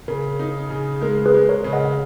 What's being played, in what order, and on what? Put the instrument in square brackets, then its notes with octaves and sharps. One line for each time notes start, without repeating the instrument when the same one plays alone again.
[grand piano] C#3 [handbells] A#4
[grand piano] D#4
C#3
[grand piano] G#3 [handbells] A#4
[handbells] G#4 B4
[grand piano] G#3
[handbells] A#4 C#5
[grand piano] C#3
[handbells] D#5 F#5